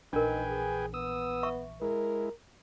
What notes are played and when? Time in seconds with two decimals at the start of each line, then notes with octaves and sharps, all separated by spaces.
0.13 A#1 E3 D4 D#4 A#4 B4 G5 G#5
0.48 G#4
0.94 B3 D#6 E6
1.43 E5 C#6
1.82 G#3 E4 A#4